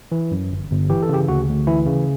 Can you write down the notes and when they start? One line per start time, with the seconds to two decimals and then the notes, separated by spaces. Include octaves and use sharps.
0.12 E3
0.31 F#2
0.51 G1
0.70 G1
0.90 E3 G4
1.03 A4
1.09 C#3 G4
1.28 D2 F#4
1.49 D2
1.67 E3 E4
1.87 C#3